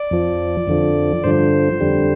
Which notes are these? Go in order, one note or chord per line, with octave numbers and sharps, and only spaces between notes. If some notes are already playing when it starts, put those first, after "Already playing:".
Already playing: D5
F2 F3
F2 D3 F3
G2 D3 F3 C5
F2 D3 G3